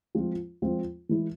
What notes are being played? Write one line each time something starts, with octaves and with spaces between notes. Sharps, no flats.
F3 G#3 C4 F4
F3 G#3 C4 F4
E3 G#3 E4